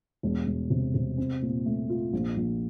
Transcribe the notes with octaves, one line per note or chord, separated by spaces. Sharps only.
E1
E1
C3
C3
C4
A#2
A3
F4
A#1
A#1